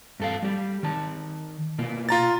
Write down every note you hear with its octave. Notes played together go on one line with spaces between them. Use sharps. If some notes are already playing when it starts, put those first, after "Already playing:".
G2 A4 F5
G3 G4
D#3 A5
B2 A#3
F4 A#5 A6